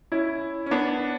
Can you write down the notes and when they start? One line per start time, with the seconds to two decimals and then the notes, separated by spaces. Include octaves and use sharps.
0.12 C#4 E4
0.66 C#4
0.71 B3 D4